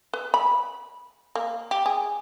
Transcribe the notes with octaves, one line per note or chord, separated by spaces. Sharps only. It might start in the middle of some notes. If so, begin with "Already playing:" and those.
B4
B5
A#3
G4
G#4